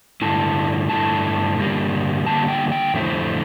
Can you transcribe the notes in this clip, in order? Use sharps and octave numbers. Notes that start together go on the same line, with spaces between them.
G2 D3 A3 E4 A5
G2 D3 A3 E4 A5
G2 D3 G3 A#3
G2 D3 G3 A#3 A5
G5
G5
F2 D3 A3 C4 E4